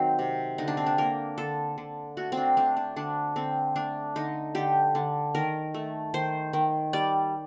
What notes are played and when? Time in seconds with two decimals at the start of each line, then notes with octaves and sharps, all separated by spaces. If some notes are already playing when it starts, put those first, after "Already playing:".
Already playing: D#3 F#3 C4 D#4
0.19 C3
0.58 D3 D#4
0.68 D4
0.77 C4
0.86 D4
0.98 A#3 A#4
1.38 D3 A4
1.78 D3
2.17 A3 F#4
2.32 C4
2.37 D4
2.57 A3 D4
2.77 D4
2.96 D3 D4
3.36 D3 C4
3.76 A3 D4
4.16 D3 D#4
4.55 D3 G4
4.95 D3
5.35 D#3 A#4
5.74 A3
6.14 D#3 C5
6.53 D#3
6.93 G3 D5